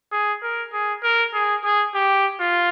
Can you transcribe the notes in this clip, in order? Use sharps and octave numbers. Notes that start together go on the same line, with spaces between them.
G#4
A#4
G#4
A#4
G#4
G#4
G4
F4